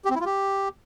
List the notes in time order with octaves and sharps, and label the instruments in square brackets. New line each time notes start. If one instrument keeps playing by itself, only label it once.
[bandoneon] G4
C4
E4
F4
G4